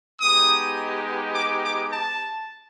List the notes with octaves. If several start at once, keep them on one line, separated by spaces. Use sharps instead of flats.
G#3 B3 D#4 G4 D#6
D6
D6
A5